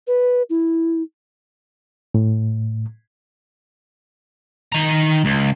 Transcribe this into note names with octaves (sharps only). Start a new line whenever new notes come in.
B4
E4
A2
D#3 A#5
C#2